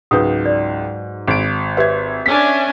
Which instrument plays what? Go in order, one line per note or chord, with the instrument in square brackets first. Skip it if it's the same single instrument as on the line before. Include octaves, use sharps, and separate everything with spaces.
[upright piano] C#2 [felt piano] G#2 F#3 G6 [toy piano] B4 D#6
[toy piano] D5
[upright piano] G#1 D7
[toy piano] G4 B4 C#5 [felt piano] E5 G#6
[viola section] C#4 D4 G#5 [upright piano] B6